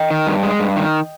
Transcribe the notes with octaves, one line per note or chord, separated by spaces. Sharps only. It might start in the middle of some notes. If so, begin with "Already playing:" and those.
Already playing: D#5 G5
D#3
G2
G#3
G2
D#3